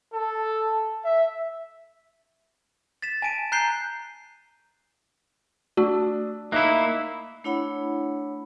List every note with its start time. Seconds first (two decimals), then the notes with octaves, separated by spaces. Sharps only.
0.14 A4
1.04 E5
3.02 A6 B6 E7
3.22 G#5 A5 D7 D#7
3.52 A#5 F#6 G6 C7 G7
5.77 A3 D4 F#4
6.52 A#3 D#4 E4 E5 F#6
7.44 A3 D4 E4 C#5 F#5 B5